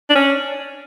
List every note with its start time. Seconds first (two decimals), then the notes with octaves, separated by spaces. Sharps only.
0.09 D4
0.15 C#4